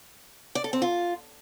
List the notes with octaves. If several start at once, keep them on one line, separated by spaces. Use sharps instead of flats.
D5
A4
C4
F4